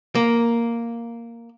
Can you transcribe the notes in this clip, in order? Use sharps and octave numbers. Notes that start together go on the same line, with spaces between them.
A#3